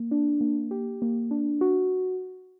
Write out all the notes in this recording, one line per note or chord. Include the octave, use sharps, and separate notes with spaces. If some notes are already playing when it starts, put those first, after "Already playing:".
Already playing: A#3
D4
A#3
G4
A#3
D4
F#4